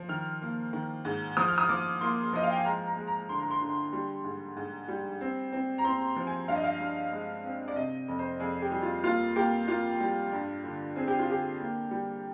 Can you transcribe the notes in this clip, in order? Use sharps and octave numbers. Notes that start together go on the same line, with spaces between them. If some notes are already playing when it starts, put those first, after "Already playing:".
Already playing: F3
D#3 F6
A#3
D#3
G#2
F3 D#6
F6
D#6
F3 D6
A#3 C6
F3 D#5
F5
G5
G#5
G#3 A#5
A#5
G#3
A#5
D3 C6
A#5
C6
D3
G3
G#2
G#2
G3
C4
C4
A#5
C4 C6
F3
G#5
G2 F5
D#5
F5
G2
G#3
C4
D5
C3 D#5
F2
C5
F2 G#4
G4
G3
F4
A#3 F4
A#3 G4
A#3 F4
G3
G2
D3
C4 G#4
G4
F4
D3 G4
A#3
G3